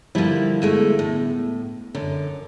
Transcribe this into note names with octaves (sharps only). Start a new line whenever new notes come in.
D3 F3 G3 A#3 E4
B2 G#3 A3
A2
F#2 D3